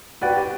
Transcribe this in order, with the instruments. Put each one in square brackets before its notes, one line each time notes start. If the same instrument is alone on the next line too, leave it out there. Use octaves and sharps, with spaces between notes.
[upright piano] F#4 [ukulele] B4 D5 G5
[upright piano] G4